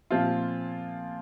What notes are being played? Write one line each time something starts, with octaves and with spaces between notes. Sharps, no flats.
A#2 F3 C4 F4